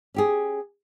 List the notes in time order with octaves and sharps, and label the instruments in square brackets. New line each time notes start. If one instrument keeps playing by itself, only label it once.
[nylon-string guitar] C#4 G4 G#4